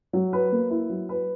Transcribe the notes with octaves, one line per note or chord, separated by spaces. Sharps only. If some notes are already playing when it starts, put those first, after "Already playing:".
F#3
B4
A#3
E4
F#3
B4